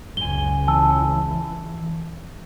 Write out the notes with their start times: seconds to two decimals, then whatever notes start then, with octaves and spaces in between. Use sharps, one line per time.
0.17 C#2 F#2 G#5 G7
0.67 E3 G#5 A5 E6